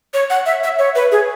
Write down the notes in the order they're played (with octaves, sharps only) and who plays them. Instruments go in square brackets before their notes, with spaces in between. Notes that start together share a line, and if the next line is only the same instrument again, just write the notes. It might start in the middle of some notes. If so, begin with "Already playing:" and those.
[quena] C#5
F#5
E5
E5
C#5
B4
G#4